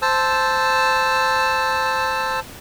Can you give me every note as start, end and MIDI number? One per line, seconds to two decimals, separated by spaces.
0.02 2.40 72
0.02 2.40 81
0.02 2.40 88